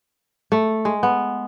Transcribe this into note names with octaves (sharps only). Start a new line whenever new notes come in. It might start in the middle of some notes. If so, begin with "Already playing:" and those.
A3
G#3
B3